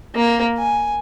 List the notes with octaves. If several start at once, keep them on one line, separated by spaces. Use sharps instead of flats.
A#3
G#5